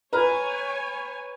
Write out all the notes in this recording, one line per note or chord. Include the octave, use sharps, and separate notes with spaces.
B4 C#5 G#5 A#5 F6